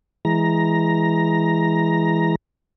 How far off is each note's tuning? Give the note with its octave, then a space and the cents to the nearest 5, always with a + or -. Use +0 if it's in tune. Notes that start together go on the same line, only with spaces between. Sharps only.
E3 +0 G#3 +0 A#5 +5